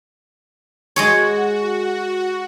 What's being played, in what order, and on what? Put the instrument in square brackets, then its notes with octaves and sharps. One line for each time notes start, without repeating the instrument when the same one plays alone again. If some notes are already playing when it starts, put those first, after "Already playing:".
[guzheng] G#3 G#4 C#5 [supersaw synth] F#4